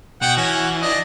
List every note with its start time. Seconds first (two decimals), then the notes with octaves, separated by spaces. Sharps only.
0.22 B2 F#5 G5
0.37 E3 C#4 F#4
0.82 D4 D#5